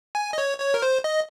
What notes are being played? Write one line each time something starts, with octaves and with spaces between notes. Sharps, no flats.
G#5
D#5
C#5
C#5
A#4
C5
D#5